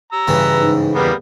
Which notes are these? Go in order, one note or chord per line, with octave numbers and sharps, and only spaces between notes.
A#5 E6
G2 C#3 E3 B4
G#2
E2 G3 A#3 B3 B4